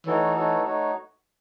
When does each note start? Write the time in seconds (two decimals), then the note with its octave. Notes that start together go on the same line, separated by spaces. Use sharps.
0.06 E3 A3 D#4 F#4 A4 C#5
0.36 A3 D#4 F#4 A4 C#5
0.65 A3 D#4 F#4 C#5